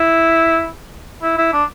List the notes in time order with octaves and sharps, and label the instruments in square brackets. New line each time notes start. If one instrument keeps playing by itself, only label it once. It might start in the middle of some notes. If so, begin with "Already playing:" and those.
Already playing: [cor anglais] E4
E4
E4
D4